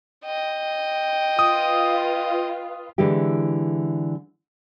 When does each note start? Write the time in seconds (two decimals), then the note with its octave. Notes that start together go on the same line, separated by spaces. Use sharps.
0.25 D#5 G5
1.39 F4 B4 D#6
2.98 D3 E3 G#3 E4 G4